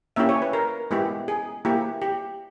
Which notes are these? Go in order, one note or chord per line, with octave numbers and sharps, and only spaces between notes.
A#3 C#4 E4 G4 E5
C#5
B4
A#4
G#3 B3 E4 G4
G#4
A#3 E4 G4
G4